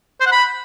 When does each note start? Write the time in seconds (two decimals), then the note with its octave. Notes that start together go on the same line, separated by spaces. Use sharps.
0.21 C5
0.26 F#5
0.32 B5